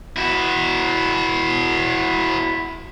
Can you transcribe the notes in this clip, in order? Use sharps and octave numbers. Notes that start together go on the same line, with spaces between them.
E4 F#4